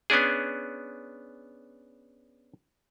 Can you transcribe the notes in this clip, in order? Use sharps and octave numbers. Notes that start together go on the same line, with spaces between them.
B3 C#4 D4 G#4